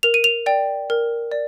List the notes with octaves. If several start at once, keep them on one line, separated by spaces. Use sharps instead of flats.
A#4 F7
D#7
F7
D5 G5
A#4
D5